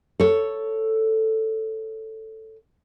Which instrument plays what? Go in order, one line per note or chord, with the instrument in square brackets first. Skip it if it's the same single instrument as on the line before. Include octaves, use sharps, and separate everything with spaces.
[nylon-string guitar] A4 C#5